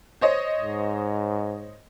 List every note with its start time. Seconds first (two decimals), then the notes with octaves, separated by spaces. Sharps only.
0.21 C5 C#5 D#5
0.60 G#2